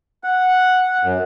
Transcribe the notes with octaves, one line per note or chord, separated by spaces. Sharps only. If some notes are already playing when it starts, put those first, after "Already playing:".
F#5
F#2